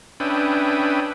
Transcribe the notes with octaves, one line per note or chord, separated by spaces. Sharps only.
C#4 D4 B4 E5 G5 D#6